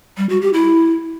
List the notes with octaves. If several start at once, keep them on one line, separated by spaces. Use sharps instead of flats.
G3
F#4
G4
E4